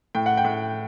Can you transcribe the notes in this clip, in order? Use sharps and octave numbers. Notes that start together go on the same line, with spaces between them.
A2 G5
F#5
G5
A2